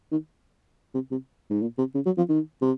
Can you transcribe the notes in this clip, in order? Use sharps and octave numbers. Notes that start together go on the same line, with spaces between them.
D#3
C3
C3
G#2
A#2
C3
C#3
F#3
F3
D#3
C3